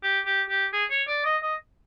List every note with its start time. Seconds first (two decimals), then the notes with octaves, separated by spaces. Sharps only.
0.03 G4
0.26 G4
0.50 G4
0.73 G#4
0.91 C#5
1.08 D5
1.25 D#5
1.42 D#5